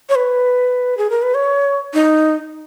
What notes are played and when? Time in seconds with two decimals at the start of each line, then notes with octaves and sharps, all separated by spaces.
0.09 C#5
0.15 B4
0.98 G#4
1.10 A#4
1.22 B4
1.34 C#5
1.94 D#4